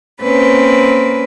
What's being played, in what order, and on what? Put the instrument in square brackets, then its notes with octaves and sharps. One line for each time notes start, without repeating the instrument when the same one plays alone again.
[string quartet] A#3 C4 C#4 B4